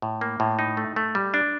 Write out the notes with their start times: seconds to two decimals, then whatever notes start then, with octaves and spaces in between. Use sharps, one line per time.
0.02 A2
0.21 A#3
0.40 A2
0.59 D#4
0.77 A3
0.96 A3
1.15 G3
1.34 D4